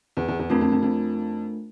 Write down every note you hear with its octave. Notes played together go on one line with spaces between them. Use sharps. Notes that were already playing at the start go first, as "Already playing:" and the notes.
E2
E2
E2
F2 A3 D4 F4 A#4
F2
F2
F2